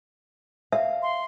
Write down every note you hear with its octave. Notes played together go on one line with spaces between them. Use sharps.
E5 F5
C6